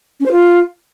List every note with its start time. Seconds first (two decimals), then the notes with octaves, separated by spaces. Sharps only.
0.20 C#4
0.26 C5
0.32 F4